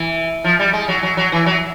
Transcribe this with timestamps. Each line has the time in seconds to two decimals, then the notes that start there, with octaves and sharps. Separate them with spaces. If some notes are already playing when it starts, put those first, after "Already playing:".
Already playing: E3
0.44 F3
0.59 G3
0.73 G#3
0.88 F#3
1.03 F#3
1.17 F#3
1.32 E3
1.46 F#3